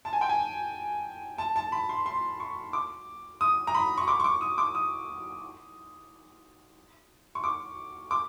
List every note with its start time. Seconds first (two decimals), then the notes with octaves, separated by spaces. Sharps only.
0.05 A5
0.13 G#5
0.21 G5
0.29 G#5
1.38 A5
1.56 A5
1.72 B5
1.89 C6
2.06 C6
2.40 C#6
2.73 D6
3.41 D#6
3.67 A#5
3.75 B5
3.98 C#6
4.08 D6
4.20 C#6
4.24 D6
4.41 D#6
4.58 D6
4.75 D#6
7.35 C#6
7.44 D6
8.11 D6